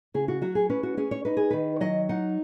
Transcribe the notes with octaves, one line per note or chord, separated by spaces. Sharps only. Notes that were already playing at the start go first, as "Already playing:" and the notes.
C#3 G#4
F#4
F#3 F#4
G#4
C#4 B4
F#4
C#4 G#4
C#5
D#4 B4
G#4
D#3 B4
F#3 D#5
D#4 F#5